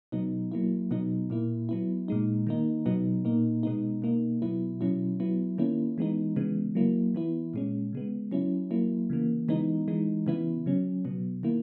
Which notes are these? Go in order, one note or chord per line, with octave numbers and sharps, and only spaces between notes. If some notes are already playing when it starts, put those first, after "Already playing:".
B2 F#3 B3 D#4
F#3 A#3 E4
B2 F#3 B3 D#4
A#2 A#3 E4
F#3 B3 E4
A#2 G#3 D#4
D#3 A#3 D#4
B2 F#3 B3 D#4
A#2 A#3 D#4
B2 G#3 B3 D#4
B2 A#3 D#4
B2 F#3 B3 E4
B2 F#3 C#4 E4
F#3 B3 E4
D#3 A#3 C#4 E4
E3 G#3 B3 D#4
C#3 E3 G#3 B3
F#3 A#3 E4
E3 B3 E4
A#2 G#3 C#4
C#3 G#3 B3
F#3 C#4 E4
F#3 A#3 E4
C#3 E3 A#3
E3 G#3 B3 D#4
E3 G#3 D#4
C#3 E3 B3 E4
C#3 F#3 C#4
B2 F#3 B3
D#3 A#3 E4